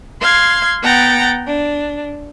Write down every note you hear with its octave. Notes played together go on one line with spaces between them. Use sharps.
F5 C6 G#6
B3 F#5 G5 A#5 A6
D4